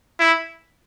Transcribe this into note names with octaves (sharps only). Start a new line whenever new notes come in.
E4